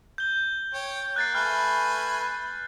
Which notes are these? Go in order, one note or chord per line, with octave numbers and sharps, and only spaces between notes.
G6 G7
C#5 G5
A#3 F#6 A6 C7
A3 B4 G#5 F6